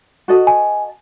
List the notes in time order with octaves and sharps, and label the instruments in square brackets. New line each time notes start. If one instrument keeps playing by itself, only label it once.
[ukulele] F#4 A4 D#5
[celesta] G#5